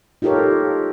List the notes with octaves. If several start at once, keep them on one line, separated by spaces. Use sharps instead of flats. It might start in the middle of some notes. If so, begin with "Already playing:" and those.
D#4 F4 G4 A4 A#4 C#5